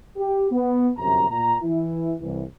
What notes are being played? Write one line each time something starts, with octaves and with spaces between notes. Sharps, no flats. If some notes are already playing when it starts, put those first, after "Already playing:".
G4
B3
G1 F#2 C3 A#5
A#2 A#5
E3 E4
C2 E3